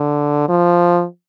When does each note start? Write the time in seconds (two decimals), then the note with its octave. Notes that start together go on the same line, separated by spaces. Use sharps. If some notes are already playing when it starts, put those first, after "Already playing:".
Already playing: D3
0.48 F3